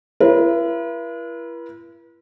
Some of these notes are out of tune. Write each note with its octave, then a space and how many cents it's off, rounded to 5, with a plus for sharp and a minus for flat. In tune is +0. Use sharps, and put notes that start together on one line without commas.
E4 +40 B4 -45